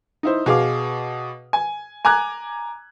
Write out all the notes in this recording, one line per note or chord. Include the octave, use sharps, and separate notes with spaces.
D#4 E4 C5
B2 G#4 F5 D6
G#5
G#5 A#5 D6 F#6 G#6